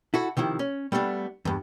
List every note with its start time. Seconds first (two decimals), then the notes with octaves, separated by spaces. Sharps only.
0.14 E4 F#4 A4
0.37 C3 D#3 F3 E4
0.59 C#4
0.92 G3 A3 B3 C#4 D4
1.45 E2 G2